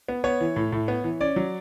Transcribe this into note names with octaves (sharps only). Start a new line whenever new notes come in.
B3
B3 C#5
E3
A2
A2
B3
E3
C#4 D5
F#3